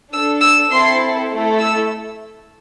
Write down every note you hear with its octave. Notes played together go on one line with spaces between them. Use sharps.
D4 A4 E6
E6
C4 E4 A4 C6
A3 E4 A4
E6